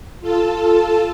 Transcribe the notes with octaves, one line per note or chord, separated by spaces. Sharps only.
F4 A4 A5